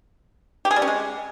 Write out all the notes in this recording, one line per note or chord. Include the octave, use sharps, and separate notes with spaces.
G4
G#4
G3
C#4
G#3